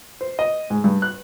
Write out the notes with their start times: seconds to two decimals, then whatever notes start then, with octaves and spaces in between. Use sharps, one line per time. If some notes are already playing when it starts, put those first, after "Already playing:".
0.21 C5
0.39 D#5
0.70 G#2
0.84 G2
1.02 F#6